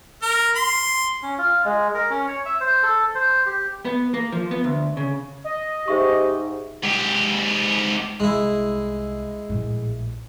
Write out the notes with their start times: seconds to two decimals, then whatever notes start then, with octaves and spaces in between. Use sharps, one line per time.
0.22 A#4
0.55 C6
1.23 C#4
1.38 F4
1.65 G#3
1.94 A#4
2.10 C#4
2.28 C#5
2.46 E5
2.61 C5
2.83 A4
3.15 C5
3.46 G4
3.85 B3
4.14 A#3
4.32 F3
4.51 B3
4.64 D2
4.97 C#3
5.44 D#5
5.88 G#2 G4 C5 E5 C#6
6.83 G#2 G4
8.20 C2 G3 G#3 E4
9.49 A#1 A2